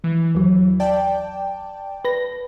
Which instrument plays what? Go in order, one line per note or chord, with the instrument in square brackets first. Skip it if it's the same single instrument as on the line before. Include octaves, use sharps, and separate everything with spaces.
[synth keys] E3
[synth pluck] D#2 F#3
[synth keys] D5 G5 A5
[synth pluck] B4 A#6